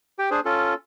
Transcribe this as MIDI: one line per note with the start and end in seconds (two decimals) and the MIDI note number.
0.19 0.30 67
0.19 0.30 79
0.31 0.40 62
0.31 0.40 68
0.31 0.40 72
0.45 0.74 61
0.45 0.74 65
0.45 0.74 69